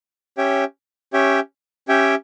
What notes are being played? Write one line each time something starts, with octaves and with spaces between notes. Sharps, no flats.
C#4 G4 C#5 E5 G5
C#4 G4 C#5 E5 G5
C#4 G4 C#5 E5 G5